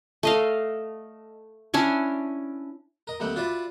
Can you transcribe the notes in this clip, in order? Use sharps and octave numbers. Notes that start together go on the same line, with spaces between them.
A3 D#5 F5
C#4 D4 E4 C#5
A#4 D#5
D#2 G3 A3 C4 F#5 G5
F4 F#4 B4 D5 E5